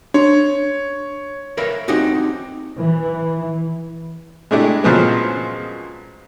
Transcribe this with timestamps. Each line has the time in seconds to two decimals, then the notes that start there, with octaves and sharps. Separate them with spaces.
0.14 D4 C#5
1.57 A#4 B4 C#5 E5 F5 B5
1.88 C4 C#4 D#4 F#4 G4 D#5
2.80 E3
4.51 G#3 A3 D4 E4 G4
4.84 A#2 C#3 F3 F#3 G#3 B3